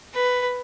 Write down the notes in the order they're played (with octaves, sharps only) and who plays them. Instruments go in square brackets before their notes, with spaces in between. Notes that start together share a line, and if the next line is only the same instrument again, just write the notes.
[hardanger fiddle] B4